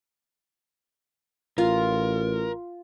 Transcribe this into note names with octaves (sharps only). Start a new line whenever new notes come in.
A1 F4 A#4